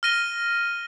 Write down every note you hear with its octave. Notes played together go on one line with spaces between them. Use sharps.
F6 A#6 D#7 G7